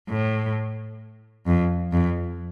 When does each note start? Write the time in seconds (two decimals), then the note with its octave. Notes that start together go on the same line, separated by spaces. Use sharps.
0.09 A2
1.47 F2
1.92 F2